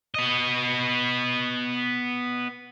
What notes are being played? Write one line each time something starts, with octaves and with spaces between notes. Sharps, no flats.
B3 D#5